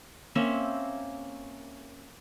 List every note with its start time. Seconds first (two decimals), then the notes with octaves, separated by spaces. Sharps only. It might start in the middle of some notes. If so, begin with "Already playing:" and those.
0.35 A#3 C4 C#4 E5